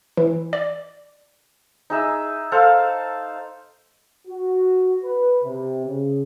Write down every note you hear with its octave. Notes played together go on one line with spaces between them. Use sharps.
E3
D5
D#4 G#4 E5
A4 C5 F5
F#4
B4
C3
C#3